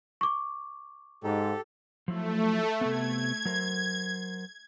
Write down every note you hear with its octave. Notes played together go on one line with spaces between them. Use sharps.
C#6 D6
G#2 G4 A4
F3 F#3 A3 E4
C3 B3 G#6
F#3 A#4 C5